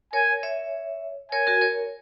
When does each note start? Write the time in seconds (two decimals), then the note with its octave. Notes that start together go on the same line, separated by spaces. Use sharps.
0.13 A#4 C#5 G#5
0.43 C#5 E5
1.32 A#4 C#5 G#5
1.47 F#4 A#4
1.61 A#4 C#5